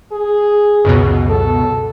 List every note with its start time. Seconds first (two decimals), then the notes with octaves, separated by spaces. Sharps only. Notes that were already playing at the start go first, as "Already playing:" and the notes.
0.12 G#4
0.85 C#2 F#2 B2
1.29 A4